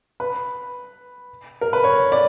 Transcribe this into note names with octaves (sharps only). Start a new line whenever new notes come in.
B4
A#4
B4
C#5
D5